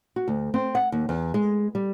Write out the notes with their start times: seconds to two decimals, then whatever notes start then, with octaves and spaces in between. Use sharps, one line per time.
0.16 F#4
0.28 D2
0.54 C4
0.75 F#5
0.92 D#2
1.09 E2
1.34 G#3
1.75 G3